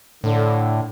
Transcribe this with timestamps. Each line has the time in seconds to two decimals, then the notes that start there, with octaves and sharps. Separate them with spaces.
0.24 A2 D3